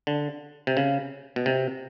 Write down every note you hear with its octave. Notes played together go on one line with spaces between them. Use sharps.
D3
C3
C#3
B2
C3